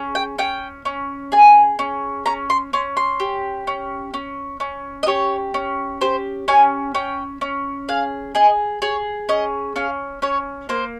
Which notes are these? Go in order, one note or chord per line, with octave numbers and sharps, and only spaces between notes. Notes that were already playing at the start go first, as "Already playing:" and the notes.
Already playing: C#4 G#4
G5
C#4 G5
C#4
G#4 G#5
C#4
C#4 A#5
C6
C#4 C6
C6
G4
C#4
C#4
C#4
D#5
G4 C#5
C#4
G4 C5
C#4 G#5
C#4 G5
C#4
G#4 F5
G#4 D#5
G#4 C#5
C#4 D#5
C#4 F5
C#4 C#5
A#3 C5